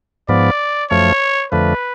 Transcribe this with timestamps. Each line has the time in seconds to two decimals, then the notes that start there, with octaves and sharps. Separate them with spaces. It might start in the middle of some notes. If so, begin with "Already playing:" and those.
0.29 G#2 F3 B3 D5
0.90 F#2 F3 A3 C#5
1.52 F2 D3 F3 A3 B4